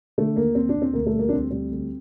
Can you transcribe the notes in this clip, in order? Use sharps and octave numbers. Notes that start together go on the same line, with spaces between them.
D3 A3
D#2 A#3
D#2 C4
D4
D#2
C4
D2 A#3
A3
G3
A#3
D4
D2 C4
G3 C4
D2